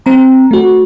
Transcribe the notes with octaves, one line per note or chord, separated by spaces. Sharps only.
C4 A#5
A3 F#4